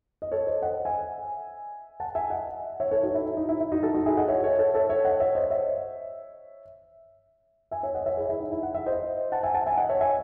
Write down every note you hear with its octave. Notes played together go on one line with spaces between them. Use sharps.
D#5
A4 C#5
C5 D#5
D#5 F#5
E5 G#5
F#5 A5
E5 G#5
D#5 F#5
C#5 E5
A4 C#5
D#4 F#4
E4
E4
D#4
E4
E4
D#4 F#4
F#4 A4
D#4 F#4
E4 G#4
D#5 F#5
C#5 E5
A4 C#5
A4 C#5
A4 C#5
C#5 E5
D#5 F#5
C#5 E5
C5 D#5
C#5 E5
E5 G#5
C#5 E5
D#5 F#5
C#5 E5
E4 G#4
E4
D#4
E4
F#5
E5
C5 D#5
F#5 A5
E5 G#5
F#5 A5
E5 G#5
D#5 F#5
C#5 E5
E5 G#5